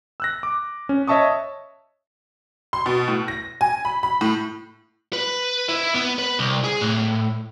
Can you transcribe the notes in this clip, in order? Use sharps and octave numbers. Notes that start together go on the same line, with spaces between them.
E6 F#6 A#6
D6
C#4
C#5 D#5 E5 A5 C#6 D#6
C6
B2
A2
A#6
G#5
B5
B5
A2
B4
E4
B3
B4
C2
G#4
A2